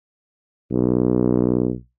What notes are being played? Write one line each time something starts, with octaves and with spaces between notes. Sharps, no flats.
B1